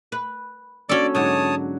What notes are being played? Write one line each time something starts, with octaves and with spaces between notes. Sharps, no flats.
B4
A#3 C#4 D4 F#4 A4 D5 D6
G#2 D3 F#3 C#5 A5 D#6